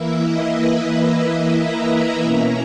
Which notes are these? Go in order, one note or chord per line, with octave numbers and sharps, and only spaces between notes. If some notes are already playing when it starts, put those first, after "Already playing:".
Already playing: E3 A#3 E4 E5
D#5
B4
A#5
B5
B2 A#3 C#4 E4 A#5